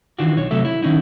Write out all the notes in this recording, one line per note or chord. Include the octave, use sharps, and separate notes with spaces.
D#3 E3 D4 F4 F#4
B1 C#5
C3 F#3 A3 A4 E5
E4
D#3 C#4 D#4 E4